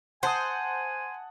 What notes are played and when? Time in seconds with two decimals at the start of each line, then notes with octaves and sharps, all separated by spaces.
0.23 C5 F#5 G#5 A5 D#6